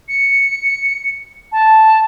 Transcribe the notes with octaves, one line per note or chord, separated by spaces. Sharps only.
C#7
A5